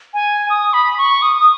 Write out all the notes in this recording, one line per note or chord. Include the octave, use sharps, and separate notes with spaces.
G#5
D#6
B5
C#6
D#6
D#6